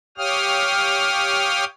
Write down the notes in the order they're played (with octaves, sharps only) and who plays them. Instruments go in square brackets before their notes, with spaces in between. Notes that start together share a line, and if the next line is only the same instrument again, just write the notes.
[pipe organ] G4 C#5 F5 G5 D#6 F6